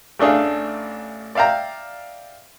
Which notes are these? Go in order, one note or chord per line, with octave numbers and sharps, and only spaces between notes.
A1 A3 D4 G#4 F5
D5 E5 F5 G5 A#5